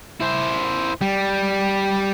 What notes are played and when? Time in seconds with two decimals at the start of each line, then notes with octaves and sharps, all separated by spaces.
0.20 E4 C5
1.01 G3